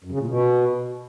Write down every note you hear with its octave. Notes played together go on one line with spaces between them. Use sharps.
F#2
C#3
A#2
B2